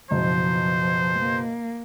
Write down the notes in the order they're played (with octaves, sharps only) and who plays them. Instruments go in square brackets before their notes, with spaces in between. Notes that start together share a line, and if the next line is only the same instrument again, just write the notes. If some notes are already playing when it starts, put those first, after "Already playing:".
[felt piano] F#1 B2 [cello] F3 [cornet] C5
[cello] A#3